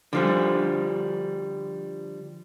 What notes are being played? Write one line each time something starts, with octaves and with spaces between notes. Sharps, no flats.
D3 F3 G3